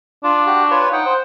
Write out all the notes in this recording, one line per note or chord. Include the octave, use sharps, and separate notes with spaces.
D4 F4
F#4 G4
F4 B4 C#5
D#4 F#5 G5
C5